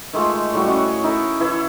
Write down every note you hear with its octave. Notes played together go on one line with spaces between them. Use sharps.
D#3 G#3 A3 F4
A2 G3 F#4
C#4 F#4 D#5 F#5
C#5
D#4 E4 A4 A#4
E3 E4 A4